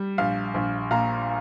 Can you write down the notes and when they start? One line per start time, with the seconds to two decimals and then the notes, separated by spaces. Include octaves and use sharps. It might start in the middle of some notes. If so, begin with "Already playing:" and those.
Already playing: G3
0.18 A#1 F5
0.54 A#1
0.91 A#2 F5 A#5